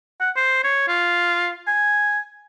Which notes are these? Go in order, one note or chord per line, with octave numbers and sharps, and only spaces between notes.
F#5
C5
C#5
F4
G#5